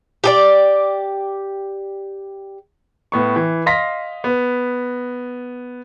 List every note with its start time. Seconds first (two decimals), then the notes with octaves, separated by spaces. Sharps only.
0.24 G4 G#4 D5
3.12 A2 B3 C#6
3.36 E3
3.66 D#5 F5 C6 A#6 B6
4.24 B3